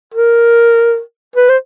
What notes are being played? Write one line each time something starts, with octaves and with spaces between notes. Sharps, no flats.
A#4
B4
C5